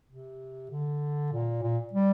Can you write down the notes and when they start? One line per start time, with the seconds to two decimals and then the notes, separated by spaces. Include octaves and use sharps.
0.09 C3
0.71 D3
1.32 A#2
1.62 A#2
1.93 G3